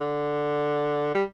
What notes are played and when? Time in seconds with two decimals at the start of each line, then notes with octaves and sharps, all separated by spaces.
0.01 D3
1.15 G3